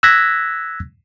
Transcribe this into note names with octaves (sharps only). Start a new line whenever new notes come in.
E6 F#6 G#6 A#6 B6